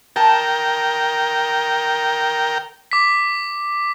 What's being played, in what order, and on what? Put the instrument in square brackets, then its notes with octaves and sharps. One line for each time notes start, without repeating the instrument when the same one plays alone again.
[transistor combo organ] A#4 G5 [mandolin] A5
[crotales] D6 B6